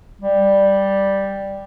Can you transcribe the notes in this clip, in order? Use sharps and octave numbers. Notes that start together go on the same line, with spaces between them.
G3